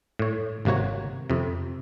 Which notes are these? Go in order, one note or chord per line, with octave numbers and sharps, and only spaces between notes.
A2 C#5
G#1 C3 A#3 F#4 C#5
F2 C3